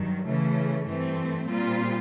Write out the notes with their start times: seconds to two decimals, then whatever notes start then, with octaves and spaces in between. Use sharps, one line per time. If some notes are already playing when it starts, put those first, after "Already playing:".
Already playing: G2 D#3 F#3
0.26 C#3 E3 A3
0.88 G2 E3 A3 C4
1.48 A#2 G3 C4 F4